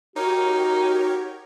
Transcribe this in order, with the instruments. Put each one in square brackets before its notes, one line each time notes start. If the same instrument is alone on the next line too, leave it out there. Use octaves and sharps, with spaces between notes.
[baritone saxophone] D#4 [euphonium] F#4 [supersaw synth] G4 A#4 C#5